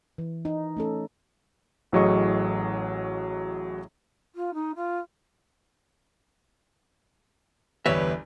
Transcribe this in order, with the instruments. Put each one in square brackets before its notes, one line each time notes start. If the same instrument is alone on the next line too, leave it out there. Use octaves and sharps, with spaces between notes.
[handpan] E3
D#4
A3 C#4 A4
[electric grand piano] A1 A2 F#3 G#4 D#5 C#6
[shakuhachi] F4
D#4
F4
[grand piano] G1 E2 G3 [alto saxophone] B4 [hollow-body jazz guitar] C#5 E5